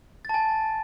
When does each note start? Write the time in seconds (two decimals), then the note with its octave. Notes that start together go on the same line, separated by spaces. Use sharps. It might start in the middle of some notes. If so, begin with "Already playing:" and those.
0.25 A6
0.29 A5
0.34 G#5